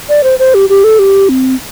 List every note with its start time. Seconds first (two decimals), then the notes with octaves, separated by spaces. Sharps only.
0.09 D5
0.24 C5
0.39 C5
0.54 G4
0.69 G4
0.84 A4
0.99 G4
1.29 C4